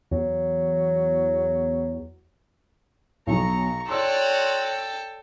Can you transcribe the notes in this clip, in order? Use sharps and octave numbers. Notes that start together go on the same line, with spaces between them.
E2 F#3
B1 B2 F#3 A#5 C#6
F#4 A4 C#5 D5 G5 C6 E6